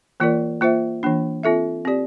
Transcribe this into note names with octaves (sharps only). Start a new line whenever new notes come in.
E3 A#3 F4 A#4 D5
A#3 F4 C5 E5
E3 A#3 D4
C4 F4 A4 E5
C4 G4 D5